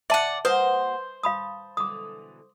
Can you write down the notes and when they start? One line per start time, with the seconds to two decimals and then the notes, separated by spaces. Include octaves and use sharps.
0.10 D5 E5 F#5 A5
0.45 A#3 F#4 B4 C5 F#5 D#6
1.23 F5 A5 B5 D#6
1.77 B2 D3 E3 D6 D#6